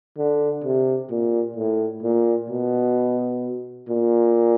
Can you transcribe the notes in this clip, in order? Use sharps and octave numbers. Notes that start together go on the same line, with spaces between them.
D3
C3
A#2
A2
A#2
B2
A#2